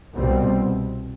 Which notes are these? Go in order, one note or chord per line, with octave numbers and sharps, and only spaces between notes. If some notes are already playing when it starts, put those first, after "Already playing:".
C2 B2 G3 C4